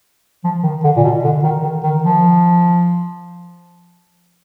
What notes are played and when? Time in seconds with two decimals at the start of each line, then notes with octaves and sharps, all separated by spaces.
0.44 F3
0.63 D#3
0.84 D3
0.97 A#2
1.04 B2
1.24 D3
1.44 D#3
1.64 D#3
1.83 D#3
2.04 F3